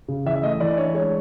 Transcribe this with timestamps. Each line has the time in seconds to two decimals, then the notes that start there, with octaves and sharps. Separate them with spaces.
0.08 C#3
0.25 E3 E5
0.36 E5
0.43 A3 D#5
0.60 E3 D5
0.77 D4 C#5
0.94 G#3 C#5